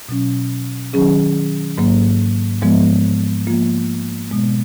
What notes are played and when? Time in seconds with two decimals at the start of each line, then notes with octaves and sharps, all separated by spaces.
0.09 B2 F#3 C#4
0.93 D#3 F#3 C#4 G#4
1.78 G#2 F#3 A#3
2.61 G#2 F3 G#3 B3
3.46 F3 A#3 F4
4.30 B2 G#3 B3